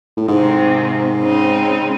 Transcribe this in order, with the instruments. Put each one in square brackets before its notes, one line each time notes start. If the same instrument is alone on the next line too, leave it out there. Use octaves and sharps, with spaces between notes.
[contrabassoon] A2
[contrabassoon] G#2 [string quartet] C3 D#3 G#3 C4
[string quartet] C#3 G#3 C4 D#4